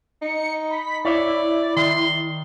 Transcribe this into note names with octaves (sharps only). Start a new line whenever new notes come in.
D#4 C#7
B5 B6
E4 C#5 D5 E5
D#3 C6